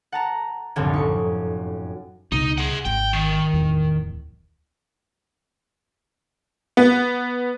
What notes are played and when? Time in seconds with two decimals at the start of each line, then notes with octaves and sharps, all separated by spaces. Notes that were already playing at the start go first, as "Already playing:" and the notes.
0.12 F#5 A5 A#5
0.76 F1 C2 F#2 A2 D3
0.93 D#4 C#6
2.32 C#2 B2 D#4
2.58 G#4 F#5
2.85 G#1 G5
3.13 D#3
3.53 D1 E2
6.77 B3